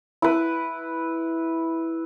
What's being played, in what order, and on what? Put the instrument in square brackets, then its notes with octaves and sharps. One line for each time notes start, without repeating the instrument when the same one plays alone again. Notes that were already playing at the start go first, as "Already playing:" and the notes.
[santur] E4 B4